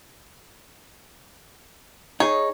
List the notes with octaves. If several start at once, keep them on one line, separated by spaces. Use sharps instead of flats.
D#4 G#4 C#5